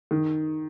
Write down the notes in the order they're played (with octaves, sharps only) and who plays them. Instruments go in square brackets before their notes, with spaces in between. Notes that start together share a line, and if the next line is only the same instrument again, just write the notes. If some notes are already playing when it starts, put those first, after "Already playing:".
[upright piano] D#3